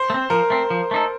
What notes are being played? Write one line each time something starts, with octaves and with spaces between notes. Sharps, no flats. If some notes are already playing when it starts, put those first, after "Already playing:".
Already playing: C5
A3
C4
F3 A#4
A3 C4
F3
A3 D#4 A4